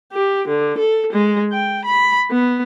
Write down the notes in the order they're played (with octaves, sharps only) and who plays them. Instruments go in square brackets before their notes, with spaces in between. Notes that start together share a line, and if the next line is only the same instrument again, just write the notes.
[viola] G4
D3
A4
G#3
G5
B5
B3